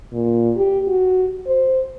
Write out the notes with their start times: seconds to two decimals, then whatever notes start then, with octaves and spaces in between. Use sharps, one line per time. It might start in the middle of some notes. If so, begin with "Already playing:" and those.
0.13 A#2
0.57 G4
0.88 F#4
1.46 C5